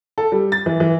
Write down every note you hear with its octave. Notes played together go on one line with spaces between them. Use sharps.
A4
G3
A6
E3
E3